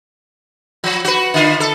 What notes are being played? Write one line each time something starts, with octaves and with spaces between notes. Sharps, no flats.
F3
F#4 B4
D3 F4
A4